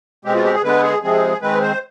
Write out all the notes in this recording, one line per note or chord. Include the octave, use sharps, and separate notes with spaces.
B2 G#3 C4 G4
F4
G4
G#4
D3 G#3 B3 B4
G#4
C3 F3 G#3 C4 G#4
D#3 G#3 C4 B4
C5